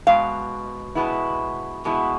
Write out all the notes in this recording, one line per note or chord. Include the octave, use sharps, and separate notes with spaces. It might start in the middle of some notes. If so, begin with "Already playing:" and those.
B2 G#3 F5
B2 G#3 B3 E4
B2 G#3 B3 E4